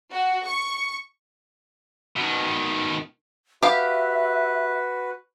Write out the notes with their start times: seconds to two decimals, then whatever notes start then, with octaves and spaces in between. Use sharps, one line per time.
0.13 F#4
0.46 C#6
2.16 B2 D#3
3.63 F#4 G4 B4 E5 F5